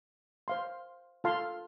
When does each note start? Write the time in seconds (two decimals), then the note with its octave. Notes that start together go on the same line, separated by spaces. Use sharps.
0.48 C5 F5 C6
1.24 F4 A4 F5 A5 C6